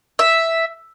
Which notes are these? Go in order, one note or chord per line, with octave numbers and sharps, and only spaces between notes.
E5